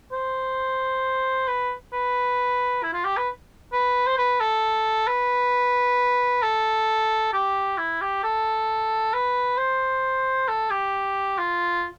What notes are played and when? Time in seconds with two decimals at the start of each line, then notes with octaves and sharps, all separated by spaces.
0.13 C5
1.48 B4
1.93 B4
2.83 E4
2.93 F4
3.05 G4
3.17 B4
3.73 B4
4.07 C5
4.18 B4
4.41 A4
5.07 B4
6.43 A4
7.33 G4
7.78 E4
8.01 G4
8.24 A4
9.14 B4
9.58 C5
10.48 A4
10.71 G4
11.38 F4